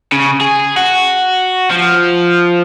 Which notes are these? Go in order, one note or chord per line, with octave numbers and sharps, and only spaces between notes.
C#3
G#4
F#4
F3